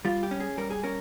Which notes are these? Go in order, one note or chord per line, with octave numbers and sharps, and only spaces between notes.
G3 F4
G4
C#4
G#4
G3 A#4
G#4
C#4 A#4